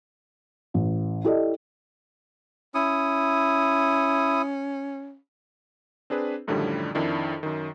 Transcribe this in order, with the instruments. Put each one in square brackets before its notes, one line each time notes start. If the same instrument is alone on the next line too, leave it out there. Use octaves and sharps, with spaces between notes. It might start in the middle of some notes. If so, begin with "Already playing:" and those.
[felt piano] A1
E4 G4 A4 D5 D#5
[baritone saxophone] C#4 [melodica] E4 D#6
[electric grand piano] C4 D4 G#4 B4
F#2 A2 D3 D#3 F3 G3
F2 D#3 D4 E4
F#2 D#3